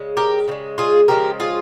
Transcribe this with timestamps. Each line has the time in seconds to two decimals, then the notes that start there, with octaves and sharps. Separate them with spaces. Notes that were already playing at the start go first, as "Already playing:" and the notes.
Already playing: C#3 G#3
0.17 G4 A#4
0.48 C#3 F3
0.51 G#3
0.78 F4 G#4
1.08 C#3 F3 G#3 G4 A#4
1.40 F4 G#4